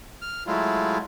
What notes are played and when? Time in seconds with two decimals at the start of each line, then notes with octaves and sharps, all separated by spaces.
0.22 F6
0.47 F#3 G#3 A3 E4 F4